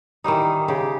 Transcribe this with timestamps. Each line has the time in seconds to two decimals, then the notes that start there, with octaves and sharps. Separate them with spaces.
0.24 D#3 E3 G3 D#4
0.68 C#3 G4